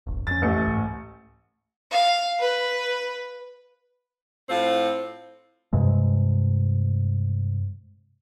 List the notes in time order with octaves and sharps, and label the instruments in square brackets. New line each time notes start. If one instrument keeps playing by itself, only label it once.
[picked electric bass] D1 G1
[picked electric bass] F2 C#4 [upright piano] A6
[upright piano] A1 A3 C#7
[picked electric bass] C#2 G#2
[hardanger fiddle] F5
B4
[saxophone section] A2 C4 F4
[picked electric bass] G2 C3 G#3